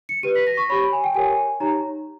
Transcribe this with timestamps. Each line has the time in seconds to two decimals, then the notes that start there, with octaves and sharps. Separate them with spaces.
0.09 C#7
0.23 G4 B4 D#7
0.35 B6
0.47 A#6
0.57 C#6
0.69 G4 C#5 B5
0.92 G#5
1.04 G5
1.14 G4 A#4 C#5 G#5
1.60 D#4 G4 C#5 A#5